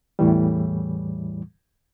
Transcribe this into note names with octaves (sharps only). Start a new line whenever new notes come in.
E2 A2 E3 G3